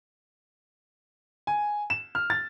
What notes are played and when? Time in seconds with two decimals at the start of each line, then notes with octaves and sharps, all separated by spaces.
1.47 G#5
1.90 E7
2.15 F6
2.30 A6